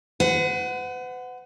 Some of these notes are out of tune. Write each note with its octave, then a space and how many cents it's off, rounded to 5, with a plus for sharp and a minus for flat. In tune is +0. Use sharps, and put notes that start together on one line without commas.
B4 +45 F#5 +0